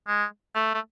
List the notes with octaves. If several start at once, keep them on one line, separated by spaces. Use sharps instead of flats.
G#3
A3
A3